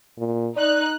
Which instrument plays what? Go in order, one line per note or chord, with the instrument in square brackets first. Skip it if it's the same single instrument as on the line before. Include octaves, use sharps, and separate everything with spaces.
[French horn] A#2
[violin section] D#4 F#6 [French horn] D5